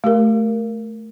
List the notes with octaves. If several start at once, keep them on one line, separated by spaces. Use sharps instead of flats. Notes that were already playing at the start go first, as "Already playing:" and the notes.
A3 G4 A#4